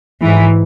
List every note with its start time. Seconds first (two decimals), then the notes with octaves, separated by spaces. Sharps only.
0.21 G#2 E3